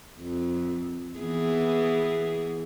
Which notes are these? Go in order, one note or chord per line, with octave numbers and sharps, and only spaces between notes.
F2
E3 B3 G#4